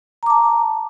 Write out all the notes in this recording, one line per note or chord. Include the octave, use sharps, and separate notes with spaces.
A5 A#5 D6